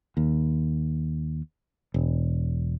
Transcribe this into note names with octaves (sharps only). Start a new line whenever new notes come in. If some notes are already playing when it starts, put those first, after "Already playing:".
D#2
E1